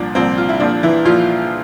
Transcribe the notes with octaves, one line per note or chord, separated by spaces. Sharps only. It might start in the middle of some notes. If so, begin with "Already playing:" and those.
Already playing: C2 A#2 F3 D4
C2 A#2 F3 C4
F4
E4
A#1 A#2 F3 D4
E3 E4
A#1 A#2 F3 F4